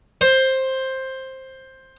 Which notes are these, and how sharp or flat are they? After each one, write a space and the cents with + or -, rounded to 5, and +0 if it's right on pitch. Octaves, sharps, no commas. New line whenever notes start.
C5 +10